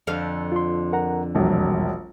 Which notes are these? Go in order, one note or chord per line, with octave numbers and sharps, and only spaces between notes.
F2 D3 F5
F4 C6
A#4 F#5 A#5
E1 A#1 B2 E3 F#3 G3